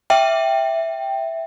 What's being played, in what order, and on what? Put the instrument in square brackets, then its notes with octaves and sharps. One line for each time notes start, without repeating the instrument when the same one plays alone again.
[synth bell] E5 G5